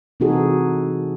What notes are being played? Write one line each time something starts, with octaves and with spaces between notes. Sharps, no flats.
C3 E3 D#4 F#4 G#4 A4